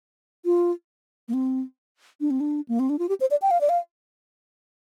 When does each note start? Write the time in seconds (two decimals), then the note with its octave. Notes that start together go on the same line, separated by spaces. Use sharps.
0.45 F4
1.28 A#3
1.34 C4
2.21 D4
2.30 C4
2.40 D4
2.69 A#3
2.79 C4
2.90 D4
2.99 F4
3.09 G4
3.21 C5
3.31 D5
3.42 G5
3.51 F5
3.61 D5
3.69 F5